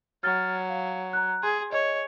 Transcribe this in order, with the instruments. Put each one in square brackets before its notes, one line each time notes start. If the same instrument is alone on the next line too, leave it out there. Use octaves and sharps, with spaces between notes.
[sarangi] F#3 [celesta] F6 A6
[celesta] F5
A#5 F#6
[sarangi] G#4 [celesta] C6
[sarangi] C#5 [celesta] D#5